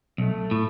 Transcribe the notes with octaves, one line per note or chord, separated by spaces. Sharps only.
B1 A3
A2